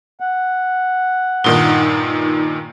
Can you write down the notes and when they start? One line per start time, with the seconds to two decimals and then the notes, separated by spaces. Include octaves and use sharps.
0.20 F#5
1.44 G2 A#2 D#3 D#4